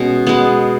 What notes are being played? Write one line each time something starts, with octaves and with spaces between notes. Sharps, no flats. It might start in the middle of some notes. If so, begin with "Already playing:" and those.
Already playing: B2 G#3 C#4
G#3 B3